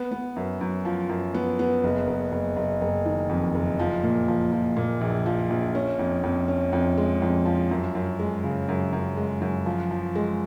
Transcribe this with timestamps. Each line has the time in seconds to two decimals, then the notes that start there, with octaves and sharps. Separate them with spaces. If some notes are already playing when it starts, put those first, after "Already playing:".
Already playing: B3
0.11 B3
0.36 F#2
0.61 F#2
0.85 F3
1.09 F#2
1.34 B3
1.59 B3
1.84 F#1
2.07 F#1
2.32 F#1
2.56 F#1
2.81 F#1
3.06 D#3
3.29 F2
3.55 F#1
3.79 F3
4.03 A#2
4.28 F3
4.53 F3
4.77 A#2
5.01 A#1
5.26 F3
5.50 A#1
5.75 C#4
5.99 F2
6.23 F2
6.48 C#4
6.73 F2
6.98 G#3
7.22 F2
7.46 F3
7.71 F#2
7.95 F#2
8.19 G#3
8.44 C#3
8.69 F#2
8.93 F#2
9.17 G#3
9.42 F#2
9.66 F3
9.91 F3
10.15 G#3